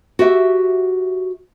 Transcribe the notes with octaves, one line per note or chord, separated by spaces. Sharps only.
F#4 G4 E5